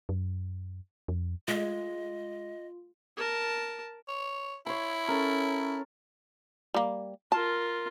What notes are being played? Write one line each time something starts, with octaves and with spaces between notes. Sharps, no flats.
F#2
F2
G#3 F4 D#5
A#4 A5
C#5
E4 C#5 C6
C#4 A4 A#4
G3 A#3
F4 A#4 A5